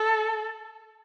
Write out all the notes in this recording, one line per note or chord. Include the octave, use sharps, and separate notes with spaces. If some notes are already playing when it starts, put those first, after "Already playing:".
Already playing: A4